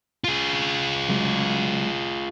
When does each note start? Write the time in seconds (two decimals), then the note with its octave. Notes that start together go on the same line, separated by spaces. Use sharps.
0.24 F4 G#4
1.09 C#3 F#3 G#3